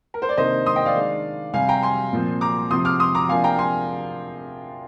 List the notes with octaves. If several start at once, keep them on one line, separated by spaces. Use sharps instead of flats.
A#4
C5
D5
C3 D#3 A#3 D4 C5 D#5
C6 D#6
D#5 G5
D5 F5
D#3 G#3 D4
C3 G3 C4 F5 G#5
G5 A#5
G#5 C6
A#2 F3 C4
A#5 D6
C3 F3 C4 C6 D#6
D6 F6
C6 D#6
A#5 D6
C3 F3 A#3 D4 F5 G#5
G5 A#5
G#5 C6